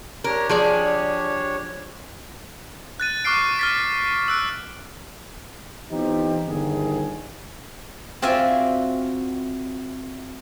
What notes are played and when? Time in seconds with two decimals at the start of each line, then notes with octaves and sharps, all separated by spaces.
0.24 D4 G4 A#4 C#5
0.49 F3 G#4 D5
3.00 F#6 A6 D#7
3.24 C#6 D6 F6 F#6 C7 D7
3.59 F6 A6 B6
4.28 E6 F#6 D7
5.91 E3 B3 C4 D#4 F4 G4
6.47 G1 G2 D#3 G#4
8.22 C4 F4 F#4 D5 E5 G#5